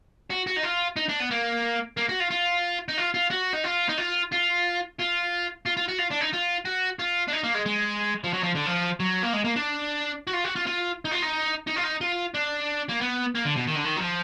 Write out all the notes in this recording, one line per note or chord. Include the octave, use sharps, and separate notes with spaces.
F#4
F#4
D#4
F4
D#4
D4
B3
A#3
A#3
F#4
F4
F4
D#4
F4
F4
F#4
D#4
F4
D#4
F4
F4
F4
F4
F4
F#4
F4
D4
D#4
F4
F#4
F4
D4
D#4
A#3
G#3
G#3
F3
F#3
F3
D3
F3
F#3
A#3
G#3
A#3
D4
F#4
F4
F#4
F4
F4
D#4
F4
D#4
D#4
F4
D#4
F4
D4
A#3
B3
A#3
D3
B2
D#3
D3
D#3
F#3
F3